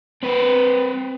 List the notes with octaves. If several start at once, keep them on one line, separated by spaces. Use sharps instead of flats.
C4 B4